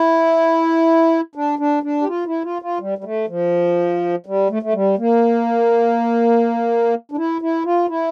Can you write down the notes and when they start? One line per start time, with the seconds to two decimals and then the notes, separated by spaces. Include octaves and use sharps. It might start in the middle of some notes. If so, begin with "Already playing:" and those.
Already playing: E4
1.35 D4
1.59 D4
1.83 D4
2.01 G4
2.08 F4
2.26 E4
2.44 F4
2.62 F4
2.80 G3
2.98 G3
3.04 A3
3.28 F3
4.26 G3
4.50 A3
4.63 A3
4.74 G3
4.98 A#3
7.12 D4
7.17 E4
7.42 E4
7.65 F4
7.89 E4